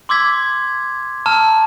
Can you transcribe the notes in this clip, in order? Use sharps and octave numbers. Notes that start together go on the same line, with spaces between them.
C6 D6 E6 G#6 B6
A5 A#5 E6 F6 E7